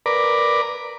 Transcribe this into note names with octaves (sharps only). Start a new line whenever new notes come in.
A#4 B4 D5